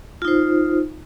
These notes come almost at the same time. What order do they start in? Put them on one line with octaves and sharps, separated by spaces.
F4 D#4 C5